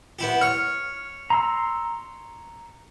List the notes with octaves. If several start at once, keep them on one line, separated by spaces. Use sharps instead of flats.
B3 E4 G4
C#5 F6
A#5 C6 E6